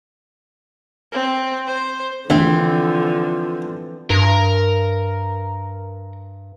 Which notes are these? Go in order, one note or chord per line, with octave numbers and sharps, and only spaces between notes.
C4
C5
D2 D3 E3 F3 C4
G2 A#4